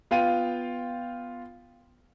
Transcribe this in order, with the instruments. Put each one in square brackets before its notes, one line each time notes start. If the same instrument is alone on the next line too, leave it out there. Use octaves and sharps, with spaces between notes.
[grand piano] B3 F4 F5 G5 D#7